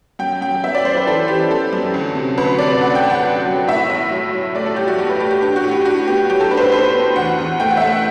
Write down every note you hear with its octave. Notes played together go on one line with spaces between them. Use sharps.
F#2 G5
F#2 G5
B3 E5
D5
F#2 C5
B4
E3 A4
E3 G4
B3 A4
F#2
D2
C3
D2 B4
C3 D5
D2 F#5
G5
D2
F#5
D2
F#3
A2 E5
B1
F#3
F#3
A3 D5
A4
F#3 G4
F#4
B1 G4
B4
A3 G4
G4
D4 G4
F#4
A2
G4
D4 F#4
B3 G4
F#3 G4
A4
D4 B4
C5
B4
A2 C5
B3
E2 F#5
E2
A3 G5
F#5
E5
A3 F#5
F#5